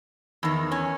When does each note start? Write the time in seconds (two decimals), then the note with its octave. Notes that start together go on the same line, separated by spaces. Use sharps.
0.43 E2 D#3
0.72 C#4